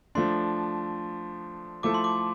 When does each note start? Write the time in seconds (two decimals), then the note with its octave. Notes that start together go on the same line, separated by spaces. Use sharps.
0.15 F3 A3 D4 C6
1.83 F3 A3 E4 A4 D6
1.94 C6
2.04 D6